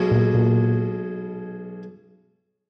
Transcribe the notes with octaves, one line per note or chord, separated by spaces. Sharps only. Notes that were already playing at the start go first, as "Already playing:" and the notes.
Already playing: B1 B2 G#3 C#4
A#2
A#2